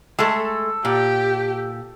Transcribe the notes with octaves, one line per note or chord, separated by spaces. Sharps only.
G#3 A3 A4
A#2 G4